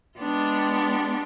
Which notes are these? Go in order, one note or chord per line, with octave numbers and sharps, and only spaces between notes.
G#3 B3 D4 F4 G4